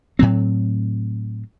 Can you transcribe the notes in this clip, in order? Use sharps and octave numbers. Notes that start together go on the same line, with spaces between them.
A2 F#3 C4